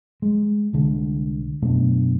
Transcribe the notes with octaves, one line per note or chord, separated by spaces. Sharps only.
G#3
C2 D3 G#3
F#2 B2 A3 D4